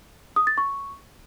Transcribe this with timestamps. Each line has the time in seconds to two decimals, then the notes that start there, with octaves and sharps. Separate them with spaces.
0.36 D#6
0.47 A6
0.58 C#6